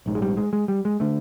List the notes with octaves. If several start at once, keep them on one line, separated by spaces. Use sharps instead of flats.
A#1 G#2
G#3
G3
G#3
G#3
G3
G#3
D3 A3